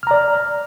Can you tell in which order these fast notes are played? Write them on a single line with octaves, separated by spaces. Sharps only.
F6 A#5 D5